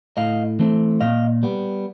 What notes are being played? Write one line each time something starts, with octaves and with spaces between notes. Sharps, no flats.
A2 D#5 F5
E3 A3 C4
A#2 D#5 F5
G3 B3